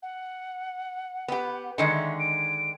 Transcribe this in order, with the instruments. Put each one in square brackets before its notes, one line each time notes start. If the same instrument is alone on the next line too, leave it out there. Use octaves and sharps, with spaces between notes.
[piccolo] F#5
[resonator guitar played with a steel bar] B3 G4
[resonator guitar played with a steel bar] D3 D#3 G#3 [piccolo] C#7
[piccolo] E5
D7